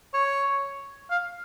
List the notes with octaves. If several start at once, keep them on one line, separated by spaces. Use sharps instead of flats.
C#5
F5